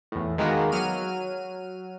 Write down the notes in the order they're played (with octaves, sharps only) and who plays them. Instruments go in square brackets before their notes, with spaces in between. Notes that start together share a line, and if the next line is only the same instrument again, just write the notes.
[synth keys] E2 A2
D#3 G#3 A#3 B3 F#4 A#4
F#3 F6 D#7